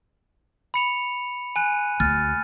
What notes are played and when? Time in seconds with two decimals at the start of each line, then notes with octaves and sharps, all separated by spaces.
0.74 B5 C#7 F7
1.56 G#5 F#6 D#7
2.00 D2 F6 A6